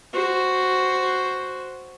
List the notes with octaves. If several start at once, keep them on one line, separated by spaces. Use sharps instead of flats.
F#4 C5